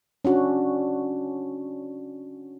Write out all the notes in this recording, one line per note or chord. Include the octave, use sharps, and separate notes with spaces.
C#4 D4 F#4